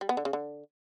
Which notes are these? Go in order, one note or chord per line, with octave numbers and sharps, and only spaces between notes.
G3
B3
D3
C#3
D3